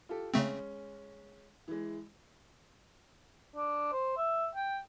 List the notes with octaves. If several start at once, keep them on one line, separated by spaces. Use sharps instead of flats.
F4 G4 A4
C#3 G#3 A3 C4 C#4
E3 G#3
D4
C5
E5
G5